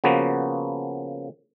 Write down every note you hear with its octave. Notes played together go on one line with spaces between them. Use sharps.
C#3 F3 A#3 B3 F#4